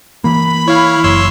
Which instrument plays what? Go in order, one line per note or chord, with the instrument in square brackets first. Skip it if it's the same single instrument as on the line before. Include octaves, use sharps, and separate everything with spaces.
[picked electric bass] E3 A#3 [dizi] B5
[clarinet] E4 [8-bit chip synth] C#5 F5
[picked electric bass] F#1 [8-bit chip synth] C#5 C6 E6